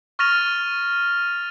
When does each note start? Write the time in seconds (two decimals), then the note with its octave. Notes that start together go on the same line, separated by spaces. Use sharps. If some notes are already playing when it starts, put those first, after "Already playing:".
0.19 C#6 F6 A6 A#6 D#7 F7